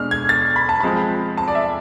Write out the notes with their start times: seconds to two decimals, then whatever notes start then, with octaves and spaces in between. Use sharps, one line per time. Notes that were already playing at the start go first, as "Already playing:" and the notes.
Already playing: B2 G#3 D4 F6
0.11 G#6
0.29 A6
0.56 B5
0.69 A5
0.80 F3 G#3 C4 B5
1.37 A5
1.48 D5
1.55 E5